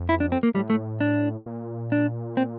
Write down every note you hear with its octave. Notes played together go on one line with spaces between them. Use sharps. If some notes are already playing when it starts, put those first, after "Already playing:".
Already playing: F2
E4
D4
C4
A#3
A2 G3
A3
D4
A#2
D4
C4